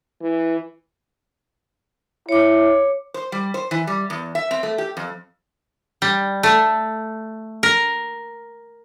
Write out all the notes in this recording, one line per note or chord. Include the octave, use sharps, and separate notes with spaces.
E3
E4 C#5 D6
C5
G3
C5
E3
G3
E2
E5
C4
A3
G4
F2
G3
A3
A#4